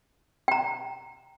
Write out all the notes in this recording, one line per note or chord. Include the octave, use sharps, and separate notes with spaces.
G5 A#5